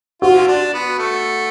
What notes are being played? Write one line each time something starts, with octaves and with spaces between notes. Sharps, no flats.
F4 F#4
D4
B3
A3